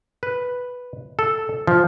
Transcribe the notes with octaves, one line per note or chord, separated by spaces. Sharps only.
B4
A4
F3